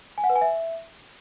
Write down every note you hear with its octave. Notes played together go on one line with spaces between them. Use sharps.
G#5
F#5
B4
G#5
E5